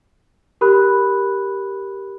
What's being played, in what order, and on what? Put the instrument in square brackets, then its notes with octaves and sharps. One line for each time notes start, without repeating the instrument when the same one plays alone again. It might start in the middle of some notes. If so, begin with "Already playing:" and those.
[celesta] G4 A#4 B5 F#6